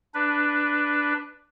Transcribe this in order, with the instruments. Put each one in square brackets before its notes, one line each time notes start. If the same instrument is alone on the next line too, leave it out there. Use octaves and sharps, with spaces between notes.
[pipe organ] D4 B4